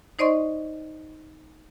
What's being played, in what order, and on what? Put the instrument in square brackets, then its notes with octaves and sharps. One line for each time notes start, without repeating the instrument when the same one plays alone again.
[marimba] D#4 C5 D5 D#5 C6 C#6